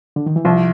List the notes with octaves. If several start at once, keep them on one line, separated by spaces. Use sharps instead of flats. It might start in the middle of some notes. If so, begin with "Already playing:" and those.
D3
D#3
E3
C2 F3